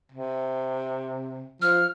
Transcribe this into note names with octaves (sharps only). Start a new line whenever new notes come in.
C3
F3 F6